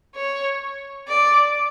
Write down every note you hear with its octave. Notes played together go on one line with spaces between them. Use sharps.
C#5
D5